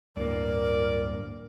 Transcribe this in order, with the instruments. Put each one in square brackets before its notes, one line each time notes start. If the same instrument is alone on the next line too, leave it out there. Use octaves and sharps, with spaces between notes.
[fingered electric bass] D1 [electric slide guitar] G2 A#3 [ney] A#4 [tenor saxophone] D5